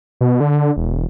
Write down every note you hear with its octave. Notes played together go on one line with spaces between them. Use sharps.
B2
D3
E1